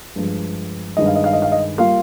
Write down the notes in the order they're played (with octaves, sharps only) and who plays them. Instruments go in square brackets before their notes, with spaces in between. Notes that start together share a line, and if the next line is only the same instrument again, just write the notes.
[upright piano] G2 F3 G#3
G2 D#3 G#3 D#5
F5
D#5
F5
D#5
F5
D#5
G3 A#3 F4 F5